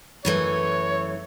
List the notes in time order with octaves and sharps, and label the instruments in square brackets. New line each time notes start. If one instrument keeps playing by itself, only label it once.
[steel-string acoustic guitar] F#2 E3 A3 [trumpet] C#5